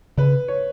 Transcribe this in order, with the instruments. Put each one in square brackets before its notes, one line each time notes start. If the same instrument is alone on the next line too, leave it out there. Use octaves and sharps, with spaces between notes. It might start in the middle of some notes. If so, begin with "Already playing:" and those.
[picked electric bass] C#3 [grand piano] B4
[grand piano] C#5